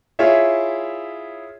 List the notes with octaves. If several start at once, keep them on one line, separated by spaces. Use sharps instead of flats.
E4 F4 G#4 C#5 E5